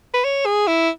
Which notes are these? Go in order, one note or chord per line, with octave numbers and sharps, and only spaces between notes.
B4
C#5
G#4
E4